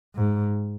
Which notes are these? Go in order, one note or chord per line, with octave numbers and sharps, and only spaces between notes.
G#2